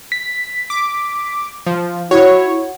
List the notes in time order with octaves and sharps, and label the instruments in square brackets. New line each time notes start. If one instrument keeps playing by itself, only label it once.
[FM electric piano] B6
[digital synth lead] D6
F3
[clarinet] E4 [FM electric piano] F#4 [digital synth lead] C#5